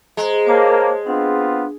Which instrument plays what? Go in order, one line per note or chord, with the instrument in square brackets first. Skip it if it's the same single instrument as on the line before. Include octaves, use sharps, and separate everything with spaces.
[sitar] G#3 [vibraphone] C5 A#5
[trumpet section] A#3 [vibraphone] C5 C#5 A5
[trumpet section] B3 C4 F4 [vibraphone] D4